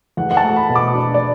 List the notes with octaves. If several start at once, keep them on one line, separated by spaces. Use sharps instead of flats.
E2 F#5
F#5
A5
A3
B5
B2
D6
D4 B5
D5